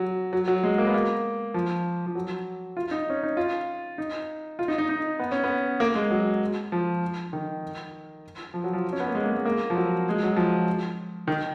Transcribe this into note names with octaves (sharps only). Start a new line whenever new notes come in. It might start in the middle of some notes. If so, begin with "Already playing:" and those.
Already playing: F#3
F#3
F#3
G#3
A#3
B3
A#3
F3
F3
F#3
F4
D#4
C#4
D#4
F4
D#4
F4
D#4
D#4
D#4
B3
C#4
B3
A#3
G#3
F#3
F3
D#3
F3
F#3
F3
C#4
B3
A#3
G#3
A#3
G#3
A#3
F3
F#3
G#3
F#3
F3
D#3